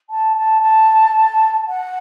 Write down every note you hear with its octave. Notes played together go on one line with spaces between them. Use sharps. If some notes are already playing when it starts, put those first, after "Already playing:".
A5
A5
A5
F#5